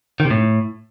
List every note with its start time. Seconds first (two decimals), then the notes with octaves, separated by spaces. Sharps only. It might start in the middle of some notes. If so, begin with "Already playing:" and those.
0.20 D#3
0.25 C3
0.30 A2